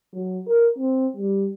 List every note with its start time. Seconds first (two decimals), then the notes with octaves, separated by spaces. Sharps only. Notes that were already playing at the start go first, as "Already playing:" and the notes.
0.14 F#3
0.47 A#4
0.78 C4
1.16 G3